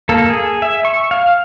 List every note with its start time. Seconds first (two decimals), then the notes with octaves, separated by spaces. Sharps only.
0.09 A#3 A4
0.30 G#4
0.62 E5
0.85 C#6
1.11 F5